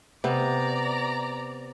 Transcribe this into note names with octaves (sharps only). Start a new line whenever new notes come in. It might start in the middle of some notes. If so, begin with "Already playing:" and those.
C3 B3 D5 A#5